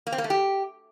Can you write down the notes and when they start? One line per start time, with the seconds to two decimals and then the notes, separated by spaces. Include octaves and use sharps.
0.07 A#3
0.12 C4
0.18 A#3
0.24 A3
0.30 G4